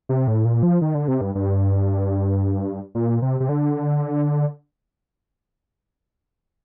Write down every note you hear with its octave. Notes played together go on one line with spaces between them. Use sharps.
C3
A2
A#2
F3
D#3
D3
C3
G2
G2
A#2
C3
C3
D3